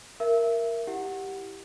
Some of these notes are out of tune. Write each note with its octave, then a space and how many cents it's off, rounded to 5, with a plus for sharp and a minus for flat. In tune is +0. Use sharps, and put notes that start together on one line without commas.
A#4 +0 E5 +20
E4 +0 G4 +0 F#5 +0